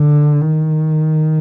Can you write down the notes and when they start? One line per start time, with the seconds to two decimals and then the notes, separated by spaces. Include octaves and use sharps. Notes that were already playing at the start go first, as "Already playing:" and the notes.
Already playing: D3
0.42 D#3